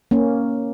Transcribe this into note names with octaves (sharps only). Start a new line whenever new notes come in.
A#3 C#4